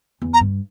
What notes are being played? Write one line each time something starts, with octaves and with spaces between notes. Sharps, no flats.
E2
A#5
G2